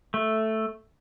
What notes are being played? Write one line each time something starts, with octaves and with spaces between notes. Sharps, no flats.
A3